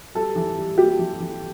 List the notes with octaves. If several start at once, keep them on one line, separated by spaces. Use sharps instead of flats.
G3 A4
E3
G3
A#3 G4
E3
E3